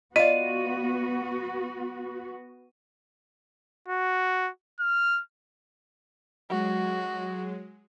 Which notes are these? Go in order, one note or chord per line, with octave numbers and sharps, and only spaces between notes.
B3 F4 F#4 D5 D#5 F5 D#7
F#4
F6
F#3 G#3 F#4